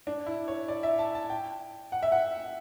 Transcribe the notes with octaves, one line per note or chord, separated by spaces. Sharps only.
D4
E4
C#5
D5
E5
A5
A5
G5
F#5
E5
F#5